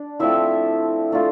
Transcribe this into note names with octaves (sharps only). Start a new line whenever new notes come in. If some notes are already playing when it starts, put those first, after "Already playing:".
Already playing: D4
F3 A3 C4 E4 E5
A3 D4 F4